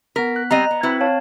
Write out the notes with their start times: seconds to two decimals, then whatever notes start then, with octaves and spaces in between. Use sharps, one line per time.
0.16 B3 A#4 B6
0.36 F#6
0.51 G3 C4 D#5 A#5
0.71 B3
0.83 C4 E4 F#4 B4
1.01 C#5 F5 A5